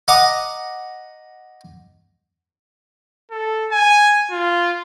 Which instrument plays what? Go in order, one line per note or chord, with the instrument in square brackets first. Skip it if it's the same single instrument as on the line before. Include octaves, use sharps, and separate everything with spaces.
[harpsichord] D#5 F#5 A#5 D6 D#6
[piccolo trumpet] A4
G#5
F4